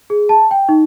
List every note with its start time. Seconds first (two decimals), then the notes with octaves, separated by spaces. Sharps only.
0.10 G#4
0.29 A5
0.51 G5
0.69 D#4